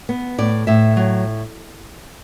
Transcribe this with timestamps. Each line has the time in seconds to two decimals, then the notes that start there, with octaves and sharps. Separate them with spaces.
0.09 B3
0.38 A2 D5
0.67 A2 E5
0.97 F#3